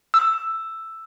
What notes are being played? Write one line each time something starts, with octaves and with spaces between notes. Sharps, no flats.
E6